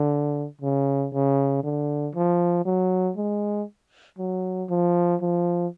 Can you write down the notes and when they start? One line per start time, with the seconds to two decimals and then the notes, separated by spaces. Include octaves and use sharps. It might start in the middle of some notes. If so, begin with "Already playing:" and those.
Already playing: D3
0.62 C#3
1.13 C#3
1.63 D3
2.15 F3
2.65 F#3
3.17 G#3
4.18 F#3
4.69 F3
5.21 F3